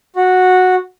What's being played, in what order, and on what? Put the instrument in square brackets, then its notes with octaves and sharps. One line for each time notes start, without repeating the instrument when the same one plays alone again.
[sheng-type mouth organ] F#4